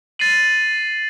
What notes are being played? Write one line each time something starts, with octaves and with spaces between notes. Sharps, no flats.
A6 C7 D#7 F#7